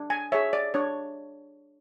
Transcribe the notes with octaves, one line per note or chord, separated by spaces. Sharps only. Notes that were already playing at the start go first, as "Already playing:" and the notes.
Already playing: D4
G#5
G#4 C#5 E5
D5
D4 C#5